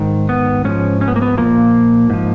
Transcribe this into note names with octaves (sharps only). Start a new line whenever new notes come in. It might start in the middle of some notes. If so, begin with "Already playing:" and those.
Already playing: G#2 D#3
B3
G#2 F3 C#4
C#4
B3
A#3
B3
A#2 F3 A#3
G#2 F3